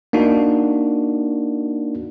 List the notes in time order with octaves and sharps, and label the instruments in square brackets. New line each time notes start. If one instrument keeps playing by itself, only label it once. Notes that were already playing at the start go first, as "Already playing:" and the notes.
[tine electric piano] A#3 D4 D#4 F#4